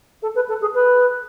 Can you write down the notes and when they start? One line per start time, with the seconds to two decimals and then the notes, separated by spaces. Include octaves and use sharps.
0.22 A4
0.35 B4
0.48 A4
0.61 G#4
0.74 B4